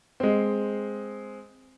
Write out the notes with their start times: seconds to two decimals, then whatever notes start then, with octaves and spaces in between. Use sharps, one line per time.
0.20 G#3 C4